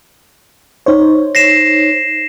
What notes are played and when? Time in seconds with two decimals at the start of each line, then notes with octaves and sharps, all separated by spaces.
0.86 D#4 C5 C#5
1.35 A#6 C7 E7